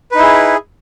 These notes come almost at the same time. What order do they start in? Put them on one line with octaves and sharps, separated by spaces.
B4 D#4 E4 G#4